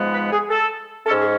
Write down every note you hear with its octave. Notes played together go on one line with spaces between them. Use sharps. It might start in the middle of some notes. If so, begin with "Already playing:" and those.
Already playing: G#2 F3 G#3 B3
B4
G#4
A4
G#2 G#3 C#4 A4
G#4